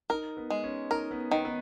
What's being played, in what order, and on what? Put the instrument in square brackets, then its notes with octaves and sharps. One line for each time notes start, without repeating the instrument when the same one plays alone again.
[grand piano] D#4 [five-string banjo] A#4
[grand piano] B3
[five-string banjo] G#3
[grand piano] C#4
[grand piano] D#4 [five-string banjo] A#4
[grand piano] B3
[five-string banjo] D#3 [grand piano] B3
[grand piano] B3